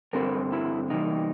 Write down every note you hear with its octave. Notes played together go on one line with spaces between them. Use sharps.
G2 D3 G3 C4 A#4
E4
C3 E3 G3 A#3 D#4